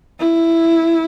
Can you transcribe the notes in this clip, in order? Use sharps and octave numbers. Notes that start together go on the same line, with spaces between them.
E4